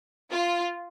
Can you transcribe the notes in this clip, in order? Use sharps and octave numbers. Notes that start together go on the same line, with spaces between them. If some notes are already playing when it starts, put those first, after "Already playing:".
F4